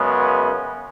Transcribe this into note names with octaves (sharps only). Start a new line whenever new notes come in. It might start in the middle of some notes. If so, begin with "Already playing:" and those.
Already playing: F#2 C#3 G#3 B3